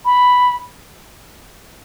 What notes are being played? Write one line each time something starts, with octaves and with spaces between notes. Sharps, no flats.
B5